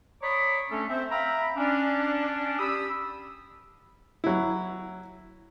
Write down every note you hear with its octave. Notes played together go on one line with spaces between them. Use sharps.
C#5 D5 A#5 B5 D6 D#6
A3 C#4 D4 A4
C4 C5 E5
E5 F5 G5 A#5 B5
C#4 D4
G4 B5 D#6 E6
F#3 E4